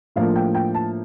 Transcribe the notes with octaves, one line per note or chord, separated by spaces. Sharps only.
A2 F3 A#3 D4 F5
G5
G5
A5